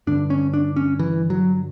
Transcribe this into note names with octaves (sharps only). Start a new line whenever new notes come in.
G2 D3 D4
C#4
D4
C#4
E3
F#3